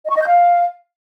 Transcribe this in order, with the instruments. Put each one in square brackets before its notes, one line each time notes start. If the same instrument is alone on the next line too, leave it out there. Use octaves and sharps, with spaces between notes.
[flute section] D#5
C#6
D#5
G6
F5